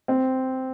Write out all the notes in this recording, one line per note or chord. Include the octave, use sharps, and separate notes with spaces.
C4